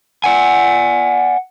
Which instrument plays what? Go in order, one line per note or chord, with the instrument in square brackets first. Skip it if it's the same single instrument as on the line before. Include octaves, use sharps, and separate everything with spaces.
[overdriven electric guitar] D5 G#5 [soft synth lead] F#5